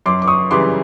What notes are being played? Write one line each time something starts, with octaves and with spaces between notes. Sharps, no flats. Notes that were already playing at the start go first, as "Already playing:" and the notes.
F#2 C6 D6
D6
C#6 D#6
C#3 E3 G3 C6 D6